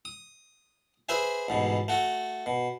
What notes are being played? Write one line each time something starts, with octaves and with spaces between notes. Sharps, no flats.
D#6
G#4 B4 C5 E5 G#5
A1 G#2 B2
A3 F#4
B2